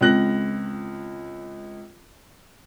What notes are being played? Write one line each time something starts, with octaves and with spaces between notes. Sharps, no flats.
C#2 C4 F#6 A#6 F#7